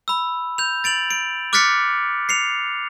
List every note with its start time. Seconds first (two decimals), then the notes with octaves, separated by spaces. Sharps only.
0.08 B5 E6
0.58 G6 F7
0.84 A6 D7 F7 F#7
1.11 D7
1.53 D6 F6 F#6 A6 B6 C#7
2.29 C7 C#7 F7